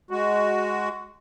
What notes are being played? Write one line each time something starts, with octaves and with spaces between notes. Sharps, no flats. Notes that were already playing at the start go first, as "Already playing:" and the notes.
G#3 F#4